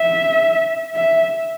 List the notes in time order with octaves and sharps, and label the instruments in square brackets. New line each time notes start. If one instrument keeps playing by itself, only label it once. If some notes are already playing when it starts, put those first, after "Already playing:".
Already playing: [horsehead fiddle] E5
E5